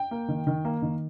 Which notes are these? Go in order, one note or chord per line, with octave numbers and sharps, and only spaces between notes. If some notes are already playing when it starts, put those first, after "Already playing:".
Already playing: G5
A#3
D#3
D#3
A#3
D#3